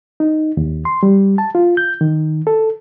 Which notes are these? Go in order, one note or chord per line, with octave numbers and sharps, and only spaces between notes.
D#4
D#2
C6
G3
A5
F4
G6
D#3
A4